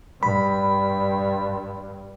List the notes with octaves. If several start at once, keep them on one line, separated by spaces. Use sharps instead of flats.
G2 B5